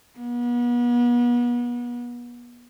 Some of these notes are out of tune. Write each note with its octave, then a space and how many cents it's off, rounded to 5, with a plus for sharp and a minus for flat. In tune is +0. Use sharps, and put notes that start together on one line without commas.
B3 -35